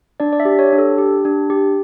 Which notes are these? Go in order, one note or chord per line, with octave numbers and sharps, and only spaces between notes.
D4 D5
D5
E5
G4
C#5
D4
A4
G4
D4
G4